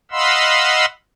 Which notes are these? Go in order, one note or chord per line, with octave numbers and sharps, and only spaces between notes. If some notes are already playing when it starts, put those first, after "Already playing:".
D#5 F5 F#5 B5 C6 E6